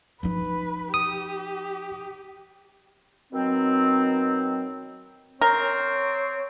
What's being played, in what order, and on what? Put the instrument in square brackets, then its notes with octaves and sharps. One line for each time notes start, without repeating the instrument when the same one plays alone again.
[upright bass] F3 D#4 [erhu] B4
[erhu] G4 [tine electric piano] D#6
[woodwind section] B2 D#3 F#3 C4
[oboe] C4 [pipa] A#4 [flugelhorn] C#5